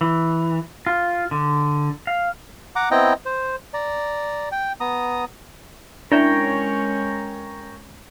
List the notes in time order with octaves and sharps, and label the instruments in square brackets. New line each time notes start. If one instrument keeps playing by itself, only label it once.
[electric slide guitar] E3
F4
D3
F5
[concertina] F#5 A#5 D6
B3 C4 E4 D#5 G5 A#5
C5
D5 A#5
G5
B3 A#5 D#6
[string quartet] G#3 C#4 [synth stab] D4 E4 [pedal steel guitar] A#4 C#5 G5